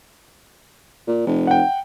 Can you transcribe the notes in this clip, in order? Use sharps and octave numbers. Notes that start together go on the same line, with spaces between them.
A#2
F1
F#5 G5